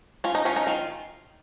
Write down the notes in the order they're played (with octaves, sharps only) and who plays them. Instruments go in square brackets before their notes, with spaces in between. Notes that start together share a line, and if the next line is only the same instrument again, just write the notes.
[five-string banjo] C#4 F4
D#4
C#4 F4
D#4
D#3 F4